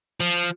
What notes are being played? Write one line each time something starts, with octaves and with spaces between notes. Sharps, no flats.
F3